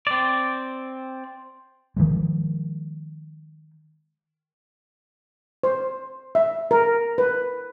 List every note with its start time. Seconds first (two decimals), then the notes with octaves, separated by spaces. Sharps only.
0.07 C4 D5
1.97 D#3 F3 G#3
5.63 C5
6.35 E5
6.71 A#4
7.18 B4